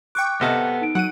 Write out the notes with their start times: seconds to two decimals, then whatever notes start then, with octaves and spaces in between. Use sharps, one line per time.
0.15 G5 C#6 D6 F#6
0.41 C3 B3 A4 D#5 F6
0.81 D#4 D7
0.95 F#3 F#5 D#7